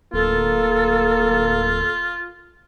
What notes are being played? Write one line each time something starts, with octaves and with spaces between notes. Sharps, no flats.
D1 A#3 F4 A4